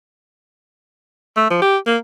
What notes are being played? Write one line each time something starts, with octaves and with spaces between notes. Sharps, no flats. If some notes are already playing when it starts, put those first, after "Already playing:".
A3
F3
G4
A#3